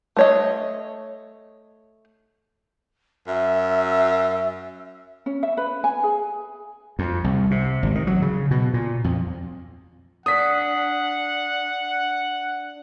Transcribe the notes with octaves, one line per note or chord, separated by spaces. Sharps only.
A3 C#5 D#5
F#2 E5
C#4
E5
B4
G#5
G#4
F2
C2
C3
G#1
D#3
F#3
C#3
B2
A#2
F2
D4 F#5 D#6 B6